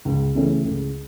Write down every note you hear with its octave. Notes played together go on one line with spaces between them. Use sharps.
C#2
C#3 E3 A3 C#4
C#2